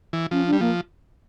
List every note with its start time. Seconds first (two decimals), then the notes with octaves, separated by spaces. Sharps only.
0.13 E3
0.31 F3 C#4
0.46 D4
0.53 G3
0.60 F3 A#3